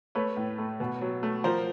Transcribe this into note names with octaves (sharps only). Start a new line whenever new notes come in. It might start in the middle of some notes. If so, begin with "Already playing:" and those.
A3 B4 C#5
A2
A3
B2
F#3
A3
F3 A#4 C5